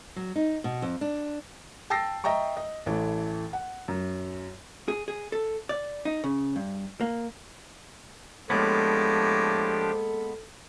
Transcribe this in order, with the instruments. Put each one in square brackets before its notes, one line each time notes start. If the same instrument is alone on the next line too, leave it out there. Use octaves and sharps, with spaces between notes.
[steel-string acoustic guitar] F#3
D#4
B2
F2
D4
[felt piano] G5 A5 E6 A6 A#6 C7
D#5 E5 G5 A#5 C#6
D#5
A1 E3 A3
F#5
F#2
[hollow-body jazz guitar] G#4
G#4
A4
D5
D#4
C#3
G2
A#3
[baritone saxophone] A2 [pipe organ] F3 D4 G4 [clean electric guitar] G#3 A#3 B3 [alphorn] A4